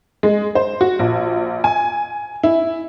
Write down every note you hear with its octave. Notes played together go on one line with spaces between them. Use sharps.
G#3
C5
F#4
A#1
G#5
E4